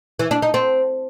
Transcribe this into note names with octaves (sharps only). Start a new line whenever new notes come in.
E3
D4
D#4
C4